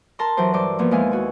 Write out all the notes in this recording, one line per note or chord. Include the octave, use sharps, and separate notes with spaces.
A#4 A5 A#5 C6
E3 F#3 E4 G4 C5
G2 C5 D6
F3 A#3 B3
D#2 G#3 E4 F5 G#5 F6
F#4 G#5